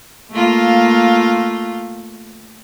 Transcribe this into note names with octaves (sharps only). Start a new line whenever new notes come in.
A3 A#3 F4